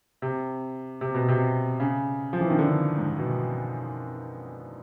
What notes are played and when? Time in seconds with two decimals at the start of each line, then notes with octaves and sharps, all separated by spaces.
0.22 C3
1.01 C3
1.15 B2
1.28 C3
1.80 C#3
2.33 F3
2.41 E3
2.50 D#3
2.59 D3
2.98 G#2
3.18 B2